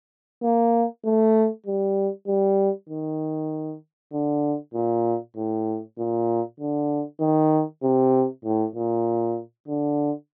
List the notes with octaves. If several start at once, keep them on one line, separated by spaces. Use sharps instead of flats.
A#3
A3
G3
G3
D#3
D3
A#2
A2
A#2
D3
D#3
C3
A2
A#2
D3